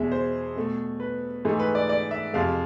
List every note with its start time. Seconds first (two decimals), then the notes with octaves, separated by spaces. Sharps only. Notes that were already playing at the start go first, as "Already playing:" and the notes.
Already playing: E2 B2 G#3 E5
0.12 C5
0.56 B2 A3
1.00 B4
1.45 G#2 E3 A3
1.60 B4
1.75 D5
1.89 D5
2.11 E5
2.33 F2 C3 F3 G#3 F5